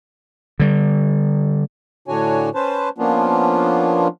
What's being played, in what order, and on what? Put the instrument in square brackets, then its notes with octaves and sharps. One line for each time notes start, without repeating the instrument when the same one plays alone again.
[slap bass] D3 G3
[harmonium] A2 D3 D4 F#4 C#5 G#5
C#4 B4 C5 A5
F3 A#3 B3 C#4 D4 F4